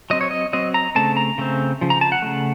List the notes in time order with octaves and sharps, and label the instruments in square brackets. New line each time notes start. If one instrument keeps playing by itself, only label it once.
[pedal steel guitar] F#3 C4 D#5
C#5
D#5
F#3 C4 D#5
A#5
C#3 A3 C4 A5
A#5
C#3 A3 C4
C#3 F3
A#5
A5
F#5
C#3 F3 A3